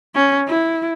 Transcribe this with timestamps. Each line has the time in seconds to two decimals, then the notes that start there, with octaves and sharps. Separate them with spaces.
0.15 C#4
0.47 E4